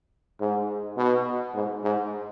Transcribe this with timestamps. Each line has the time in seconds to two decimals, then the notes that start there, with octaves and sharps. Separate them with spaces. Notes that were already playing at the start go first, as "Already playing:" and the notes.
0.41 G#2
0.97 B2
1.55 G#2
1.84 G#2